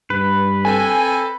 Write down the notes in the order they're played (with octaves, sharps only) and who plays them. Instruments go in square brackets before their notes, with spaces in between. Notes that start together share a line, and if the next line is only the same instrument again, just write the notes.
[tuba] G2 [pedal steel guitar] B4
[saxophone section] C4 A4 [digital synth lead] G#5